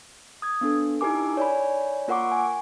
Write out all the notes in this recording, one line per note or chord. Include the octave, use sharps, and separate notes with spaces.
D#6 G#6
B3 D4 A4
D#4 E4 G4 A#4 G#5 D6
C#5 D5 G#5 B5
A#3 F4 A#4 F#5 C#6 D6
G#5